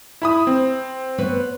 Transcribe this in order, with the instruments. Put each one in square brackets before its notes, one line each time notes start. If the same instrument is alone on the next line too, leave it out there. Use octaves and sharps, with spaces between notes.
[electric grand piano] E4 B5 D#6
C4
[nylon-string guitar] B3 B4 C#5